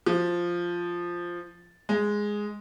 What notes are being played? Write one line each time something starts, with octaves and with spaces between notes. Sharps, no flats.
F3
G#3